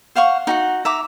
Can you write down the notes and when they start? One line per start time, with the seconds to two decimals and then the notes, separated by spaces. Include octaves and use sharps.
0.15 C5 F5 F#5 C#6
0.47 D#4 F#4 F#5
0.85 E5 A#5 D6